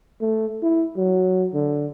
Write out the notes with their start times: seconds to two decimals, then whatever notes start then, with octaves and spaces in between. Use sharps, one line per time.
0.21 A3
0.63 E4
0.97 F#3
1.54 D3